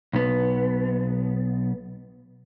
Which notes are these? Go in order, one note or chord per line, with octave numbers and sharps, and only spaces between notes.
B1 B3